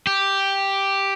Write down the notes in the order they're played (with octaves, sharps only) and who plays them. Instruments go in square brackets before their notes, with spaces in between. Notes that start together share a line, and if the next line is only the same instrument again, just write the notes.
[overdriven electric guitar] G4